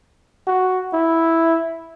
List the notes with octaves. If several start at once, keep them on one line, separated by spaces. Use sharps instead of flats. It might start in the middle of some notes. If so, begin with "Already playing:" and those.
F#4
E4